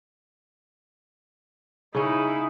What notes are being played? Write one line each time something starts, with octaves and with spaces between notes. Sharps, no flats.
C#3 C#4 D#4 E4